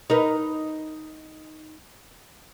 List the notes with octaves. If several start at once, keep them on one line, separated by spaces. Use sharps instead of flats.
D#4 A#4 B4